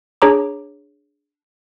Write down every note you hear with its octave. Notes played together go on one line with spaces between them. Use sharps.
D4 G#4 C#5 A#5 D6